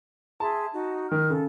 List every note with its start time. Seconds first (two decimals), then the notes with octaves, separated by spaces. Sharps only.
0.40 G#4 E5 A5 C6
0.73 D#4 F#4
1.11 D#3 F6
1.30 C#3 A4